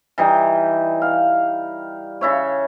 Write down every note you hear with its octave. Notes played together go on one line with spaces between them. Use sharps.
E3 G3 D#4
F5
C#3 E4 C#5